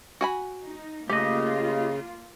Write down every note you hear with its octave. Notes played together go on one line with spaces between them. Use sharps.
F#4 G#5 B5
D#4
C#3 A3 A#3 F4 G4 D#5